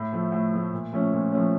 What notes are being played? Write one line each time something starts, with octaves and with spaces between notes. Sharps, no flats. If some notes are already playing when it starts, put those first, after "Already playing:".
Already playing: A2
F3 A3
A2
F3 A3
A#2
F3 A3 C#4
A#2
F3 A3 C#4